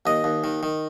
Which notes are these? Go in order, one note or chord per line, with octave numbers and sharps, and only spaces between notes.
D#2 D#5
D#2
D#3
D#3